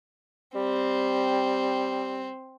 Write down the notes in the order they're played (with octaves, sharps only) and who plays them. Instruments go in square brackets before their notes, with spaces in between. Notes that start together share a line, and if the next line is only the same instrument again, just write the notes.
[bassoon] G3 [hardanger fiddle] C4